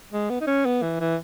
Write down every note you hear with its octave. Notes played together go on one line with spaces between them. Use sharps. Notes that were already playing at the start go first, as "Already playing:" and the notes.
G#3
B3
D#4
C#4
B3
E3
E3